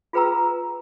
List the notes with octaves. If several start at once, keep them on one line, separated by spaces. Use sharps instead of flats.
F4 G#4 B4 G5 A#5 E6